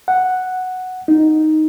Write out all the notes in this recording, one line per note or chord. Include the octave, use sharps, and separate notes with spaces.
F#5
D#4